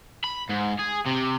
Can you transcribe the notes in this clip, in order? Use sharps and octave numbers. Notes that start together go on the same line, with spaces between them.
B5
G#2
G#4
C3